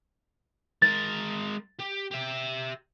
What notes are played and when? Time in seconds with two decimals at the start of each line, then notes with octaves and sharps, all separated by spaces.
0.82 G#3 A#4 A6
1.79 G4
2.11 G4 E5